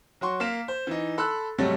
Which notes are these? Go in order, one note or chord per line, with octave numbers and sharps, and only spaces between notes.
F#3 F#4 C6 C#6
A#3 F5 B6 E7
C5
E3 D#4
A4 B5 C6 E6 F#6
G#2 C3 F#3 G3 A3